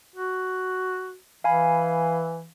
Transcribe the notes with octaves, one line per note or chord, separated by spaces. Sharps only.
F#4
E3 F5 G#5 B5